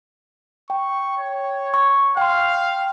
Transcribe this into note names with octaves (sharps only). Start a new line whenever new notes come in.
G5 C#6
C#5
C#6
F5 G5 C6